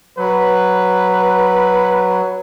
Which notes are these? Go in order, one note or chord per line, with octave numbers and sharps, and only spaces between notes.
F#3 B4